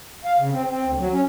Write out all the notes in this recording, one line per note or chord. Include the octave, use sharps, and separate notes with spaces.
F5
C#3
C4
C4
D2
F#3
C#4